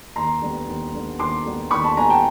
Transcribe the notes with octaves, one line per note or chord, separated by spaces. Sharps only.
D#2 A#5 C6
D3 G3 B3
D#2
D3 G3 B3
D#2 C6 D6
D3 G3 B3
D#2 B5 C#6
A5 B5
D3 G3 B3 G#5 A#5
G5 A5